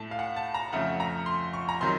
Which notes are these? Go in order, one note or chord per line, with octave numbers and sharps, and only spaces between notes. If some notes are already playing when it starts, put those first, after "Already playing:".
Already playing: A2 A3 A5
F5
F#5
A5
A#5
F2 C#3 A3 F#5
A#5
C6
C#6
A#5
C3 D#3 F#3 C6